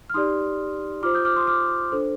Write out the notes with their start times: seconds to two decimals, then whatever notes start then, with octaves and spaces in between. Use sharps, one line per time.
0.10 F6
0.14 D#4 G4 D5 C6 D#6
1.03 F4 C5 D6 F6
1.14 D#6 G6
1.25 D6 F6
1.36 C6 D#6
1.47 D6 F6
1.92 D4 A4 C5